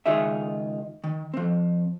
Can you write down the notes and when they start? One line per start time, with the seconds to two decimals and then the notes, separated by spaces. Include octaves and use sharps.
0.06 C#2 D#3 F4 G#4 E5
1.04 D#3
1.34 F3 C4